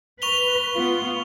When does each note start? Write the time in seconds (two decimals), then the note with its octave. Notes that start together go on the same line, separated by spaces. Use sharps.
0.22 B4 C#6 F7 G7
0.75 B3 F4